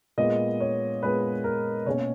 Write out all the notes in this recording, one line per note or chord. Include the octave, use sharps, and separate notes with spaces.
A#2 G#3 B3 D#5
C#5
A#2 G#3 B3 B4
A#4
B2 A#3 C#4 C#5